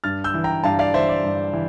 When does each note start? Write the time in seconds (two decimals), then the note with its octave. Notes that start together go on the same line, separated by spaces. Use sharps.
0.04 G2 F6 A6
0.24 E6 G6
0.34 E3
0.44 G5 A#5
0.64 G2 F5 A5
0.79 D5 F5
0.94 E3 C5 E5
1.09 D5
1.24 G2
1.53 E3